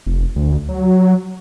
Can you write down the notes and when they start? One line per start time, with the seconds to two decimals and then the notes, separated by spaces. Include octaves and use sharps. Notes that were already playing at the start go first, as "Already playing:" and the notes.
0.07 F1
0.36 D2
0.69 F#3